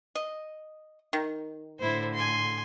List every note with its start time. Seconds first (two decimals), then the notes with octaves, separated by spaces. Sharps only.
0.15 D#5
1.13 D#3
1.79 A2 D3 E4 C5
2.14 G#5 C6